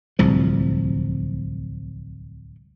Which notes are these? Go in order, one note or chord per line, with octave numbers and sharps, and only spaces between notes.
D1 C2 F3